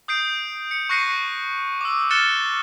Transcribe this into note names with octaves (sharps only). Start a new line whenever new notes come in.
D#6 G6 C7 D7
C#7
C#6 F#6 A#6 C7 C#7 D#7
D6 E6
F6 F#6 A6 C#7 E7 G7